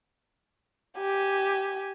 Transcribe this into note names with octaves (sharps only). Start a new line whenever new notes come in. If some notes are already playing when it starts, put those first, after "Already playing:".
G4 G#5